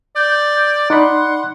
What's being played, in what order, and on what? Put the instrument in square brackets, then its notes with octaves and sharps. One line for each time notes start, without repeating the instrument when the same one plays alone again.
[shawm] D5 [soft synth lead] G6
[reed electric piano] D#4 D5 B5 [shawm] F#5 [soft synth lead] C6